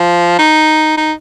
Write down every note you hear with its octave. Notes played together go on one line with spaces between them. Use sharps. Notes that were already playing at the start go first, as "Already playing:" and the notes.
Already playing: F3
D#4
D#4